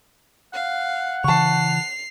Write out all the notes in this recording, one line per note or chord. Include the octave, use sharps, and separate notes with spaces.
F5 F#5
C#3 E3 A5 C#6 C7 F7